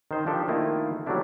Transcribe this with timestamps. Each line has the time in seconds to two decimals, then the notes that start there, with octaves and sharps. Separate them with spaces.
0.11 D#3 C5 D#5
0.26 F3 D4 G4 A4
0.48 D#3 A3 A#3 E4 F4
1.06 F#3 G3 A3 B3 D4 E4